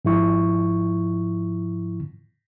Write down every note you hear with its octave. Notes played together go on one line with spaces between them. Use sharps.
G#2 F3 E4 C#6